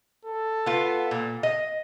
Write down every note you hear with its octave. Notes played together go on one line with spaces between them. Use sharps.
A4
B3 F4
A#2
D#5